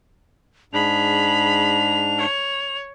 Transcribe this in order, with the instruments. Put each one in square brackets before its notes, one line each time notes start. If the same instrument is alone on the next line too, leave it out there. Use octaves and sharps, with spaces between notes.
[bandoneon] G#2 D4 [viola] G#4 B5 [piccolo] F7
[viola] C#5